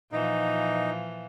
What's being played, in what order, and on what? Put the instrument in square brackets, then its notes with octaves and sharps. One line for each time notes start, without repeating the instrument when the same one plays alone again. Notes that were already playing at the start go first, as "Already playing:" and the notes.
[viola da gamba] A#2 E3 F3 [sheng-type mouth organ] D#4